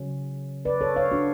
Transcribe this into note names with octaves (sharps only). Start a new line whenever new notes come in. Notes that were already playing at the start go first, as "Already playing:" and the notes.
Already playing: C#3 F#3 C#4
B4 D5
A4 C#5
C#5 F5
D4 F#4